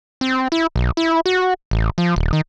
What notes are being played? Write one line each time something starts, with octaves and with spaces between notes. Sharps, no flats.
C4
E4
B1
E4
F#4
A1
F3
D#1
D#3